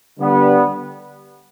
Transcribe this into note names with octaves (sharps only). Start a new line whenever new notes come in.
D3 G3 B3